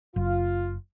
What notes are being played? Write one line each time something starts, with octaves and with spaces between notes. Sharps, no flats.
F#1 F4